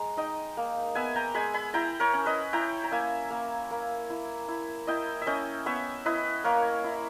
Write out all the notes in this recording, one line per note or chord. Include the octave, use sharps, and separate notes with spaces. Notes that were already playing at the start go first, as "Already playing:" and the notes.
Already playing: G#3 A#5
D#4 D#5 G5
A#3
B3 E5 G#5
G5 A#5
G#3 G#5 B5
G#5 B5
E4 G5 A#5
A#4 C#5
C#4
B4 D#5
E4 G5 A#5
A#5
A#3 E5 G#5
A#3
A#3
E4
E4
E4 D#5 G5
E5
C#4 D#5 G5
B3 C#5 E5
E4 B4 D#5
A#3 A#4 C#5
E4